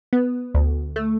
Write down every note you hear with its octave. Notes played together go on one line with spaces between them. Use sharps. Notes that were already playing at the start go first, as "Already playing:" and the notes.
B3
D2
A3